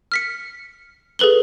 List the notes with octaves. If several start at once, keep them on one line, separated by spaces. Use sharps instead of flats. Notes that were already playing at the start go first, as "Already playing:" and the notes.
F6 B6 C#7
G#4 A4 B4 F#7 G7